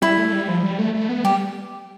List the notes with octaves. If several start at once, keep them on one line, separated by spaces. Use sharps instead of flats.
G3 E4
A3
G3
F3
G3
A3
A3
B3
G3 G4